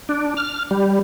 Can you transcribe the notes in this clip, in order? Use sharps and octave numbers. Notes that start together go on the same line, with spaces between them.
D4
F6
G3